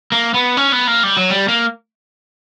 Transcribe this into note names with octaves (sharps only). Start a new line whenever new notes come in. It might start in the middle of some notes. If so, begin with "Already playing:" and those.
A#3
B3
C#4
B3
A#3
G3
F#3
G3
A#3